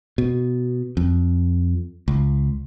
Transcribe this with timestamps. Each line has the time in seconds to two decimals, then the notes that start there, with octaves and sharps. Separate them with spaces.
0.18 B2
0.97 F2
2.08 C#2